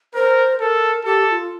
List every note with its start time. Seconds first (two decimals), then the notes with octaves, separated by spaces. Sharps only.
0.14 A#4 C5
0.60 A4 A#4
1.05 G4 A4
1.27 G4
1.31 F4